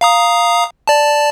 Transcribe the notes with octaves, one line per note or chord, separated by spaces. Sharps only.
F5 A#5 D#6
D5 A5